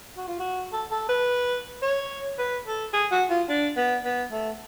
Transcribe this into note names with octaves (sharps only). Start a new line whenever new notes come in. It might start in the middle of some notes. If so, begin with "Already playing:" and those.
F#4
F4
F#4
A4
A4
B4
C#5
B4
A4
G#4
F#4
F4
D4
B3
B3
A3